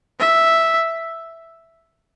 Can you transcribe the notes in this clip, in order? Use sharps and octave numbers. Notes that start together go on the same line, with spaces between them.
E5